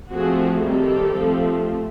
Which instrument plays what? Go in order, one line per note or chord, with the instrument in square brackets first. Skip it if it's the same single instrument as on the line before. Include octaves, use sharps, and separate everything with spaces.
[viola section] F3 A3 C4 F#4 G#4
D#3 G3 C4 G4 A4
F3 A3 C4